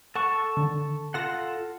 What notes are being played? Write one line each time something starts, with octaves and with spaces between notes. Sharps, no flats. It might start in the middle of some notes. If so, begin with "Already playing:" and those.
A4 F#5 A5 C#6
D3 D#3
F4 A4 F#5 C6 A#6